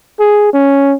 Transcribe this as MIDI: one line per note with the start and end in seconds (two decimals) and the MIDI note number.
0.20 0.53 68
0.53 0.94 61